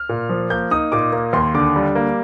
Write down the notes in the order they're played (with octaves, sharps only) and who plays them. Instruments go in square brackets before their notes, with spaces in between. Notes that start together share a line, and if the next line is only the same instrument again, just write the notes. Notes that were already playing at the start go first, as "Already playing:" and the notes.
Already playing: [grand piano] F6
A#2
F3
A#3 G6
D#4 D#6
A#2 D6
A#3
D#2 C6
D3 D6
G3
A#3